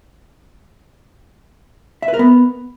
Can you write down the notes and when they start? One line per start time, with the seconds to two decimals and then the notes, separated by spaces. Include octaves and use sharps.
2.02 E5
2.08 B4
2.14 A#4
2.19 B3